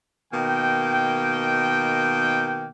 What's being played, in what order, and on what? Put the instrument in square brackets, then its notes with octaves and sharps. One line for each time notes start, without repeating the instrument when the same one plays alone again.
[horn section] B2 D#3 A#3 G5